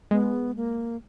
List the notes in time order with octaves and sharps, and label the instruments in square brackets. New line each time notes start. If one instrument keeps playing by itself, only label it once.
[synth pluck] G#3 [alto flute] B3
[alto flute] A#3